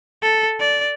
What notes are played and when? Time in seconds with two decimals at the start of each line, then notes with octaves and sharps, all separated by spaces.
0.22 A4
0.60 D5